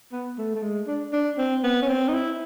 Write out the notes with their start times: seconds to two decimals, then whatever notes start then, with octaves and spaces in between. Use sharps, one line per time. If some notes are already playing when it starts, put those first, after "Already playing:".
0.12 B3
0.38 A3
0.55 A3
0.62 G#3
0.87 D4
1.13 D4
1.38 C4
1.64 B3
1.82 C#4
1.88 C4
2.09 D#4
2.14 E4